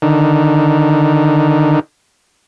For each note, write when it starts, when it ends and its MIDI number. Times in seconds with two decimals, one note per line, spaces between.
0.02 1.80 50
0.02 1.80 51